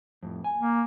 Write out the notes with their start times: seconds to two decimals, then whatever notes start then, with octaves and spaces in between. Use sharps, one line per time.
0.23 F2 A2
0.44 G#5
0.58 A#3